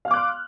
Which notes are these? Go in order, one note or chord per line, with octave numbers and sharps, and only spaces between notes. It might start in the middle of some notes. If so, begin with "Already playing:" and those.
F5 C6 D6 F6 F#6